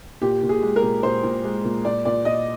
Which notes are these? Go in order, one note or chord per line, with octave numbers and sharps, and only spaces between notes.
A#2 G4
A#2
G#4
G#3
A#4
A#2
A#2 C5
A#2
G#3
A#2
A#2 D5
A#2 D5
A#2 D#5